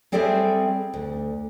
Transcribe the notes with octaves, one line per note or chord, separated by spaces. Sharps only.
G3 C4 G#4 A4 D5 E5
D2